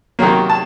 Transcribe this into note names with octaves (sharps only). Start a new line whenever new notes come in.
C3 D#3 F#3 A#3
A5